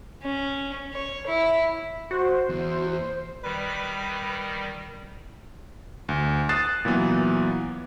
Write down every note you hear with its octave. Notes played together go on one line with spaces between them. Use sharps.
C#4
C#5
E4
F#4 C5
E2
D#3 G3 B4
D2
D#6 F#6 A6 C7 E7
A#2 E3 F#3 B3